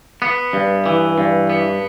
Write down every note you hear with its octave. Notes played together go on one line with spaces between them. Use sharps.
B3
G2
E3
G2
B3